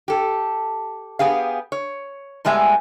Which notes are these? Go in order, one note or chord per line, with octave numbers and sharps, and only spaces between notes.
G4 A4
B3 G4 G#4 F5
C#5
A2 G3 G#3 B3 E5 G#5